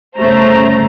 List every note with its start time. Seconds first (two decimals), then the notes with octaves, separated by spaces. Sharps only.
0.18 G1 C#3 A3 C5 A#5